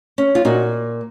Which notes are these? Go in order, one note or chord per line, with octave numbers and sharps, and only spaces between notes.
C#4
F4
A#2 D#4 F#4